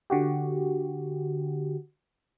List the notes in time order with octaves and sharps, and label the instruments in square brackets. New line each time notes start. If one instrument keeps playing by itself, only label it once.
[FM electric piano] D3 F#4 G4